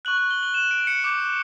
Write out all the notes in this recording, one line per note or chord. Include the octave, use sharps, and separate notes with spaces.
C#6 F#6 F#7
F#7
G7
F#7
E7
D7
C#7
D6 G6